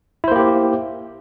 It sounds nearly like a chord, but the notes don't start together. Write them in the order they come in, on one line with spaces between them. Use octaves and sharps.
E4 C5 A#3 G4